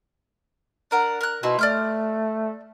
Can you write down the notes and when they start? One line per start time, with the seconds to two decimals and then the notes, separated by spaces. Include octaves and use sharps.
0.91 D4 A#4 F#5
1.21 A#4 F#6
1.43 B2 C4 D#4 E4
1.59 A3 D5 F6 G6